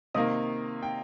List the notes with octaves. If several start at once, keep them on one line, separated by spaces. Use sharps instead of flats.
C3 D#3 A#3 D#5 D#6
G5